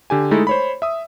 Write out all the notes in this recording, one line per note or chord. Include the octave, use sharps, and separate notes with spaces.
D3 G4 G#5
G#3 A3 D#4 E4 A4
C5 C#5 B5
E5 D#6